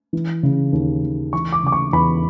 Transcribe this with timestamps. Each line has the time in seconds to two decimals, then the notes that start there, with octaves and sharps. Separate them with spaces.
0.13 E3
0.43 C#3
0.72 D#2
1.03 D#2
1.33 E3 C#6
1.52 D6
1.63 C#3 D6
1.72 C#6
1.93 E2 B5